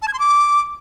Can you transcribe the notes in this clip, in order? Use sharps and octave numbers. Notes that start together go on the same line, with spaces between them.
A5
G#6
C6
D6